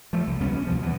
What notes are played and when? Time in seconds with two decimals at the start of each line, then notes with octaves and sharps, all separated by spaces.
0.13 F3 A3
0.27 C2
0.40 C#2 G3 B3 C#4
0.55 C#4
0.67 D#2 B2 F3
0.83 E3 B3